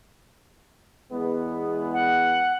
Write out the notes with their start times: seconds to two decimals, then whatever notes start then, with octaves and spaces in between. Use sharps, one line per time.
1.12 E2 G#3 B3
1.93 F#5